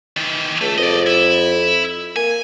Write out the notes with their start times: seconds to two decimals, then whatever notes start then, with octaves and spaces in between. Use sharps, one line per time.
0.17 D#3 E3
0.61 C#2 A3
0.78 F2 D5 D#5
1.06 E4
2.16 A#3 G#5